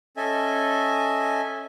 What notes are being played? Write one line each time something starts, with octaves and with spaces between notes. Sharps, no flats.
C#4 A4 D#5 E5 G#5